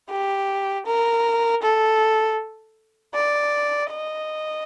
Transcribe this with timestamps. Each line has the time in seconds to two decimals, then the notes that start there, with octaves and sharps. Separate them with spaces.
0.09 G4
0.86 A#4
1.63 A4
3.14 D5
3.91 D#5